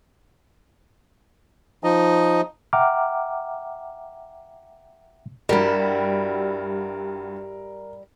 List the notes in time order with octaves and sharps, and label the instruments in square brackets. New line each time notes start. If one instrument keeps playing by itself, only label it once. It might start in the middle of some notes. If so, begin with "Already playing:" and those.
[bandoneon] F3 D#4 D#5
[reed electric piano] E5 F#5 G5 A#5 D6 F6
[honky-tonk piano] G2 F#4 [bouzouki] G3 E4 [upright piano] A#4